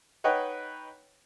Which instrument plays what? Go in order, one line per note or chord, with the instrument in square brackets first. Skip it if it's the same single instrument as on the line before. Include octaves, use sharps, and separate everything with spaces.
[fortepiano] D#4 B4 C#5 D#5 F#5 G5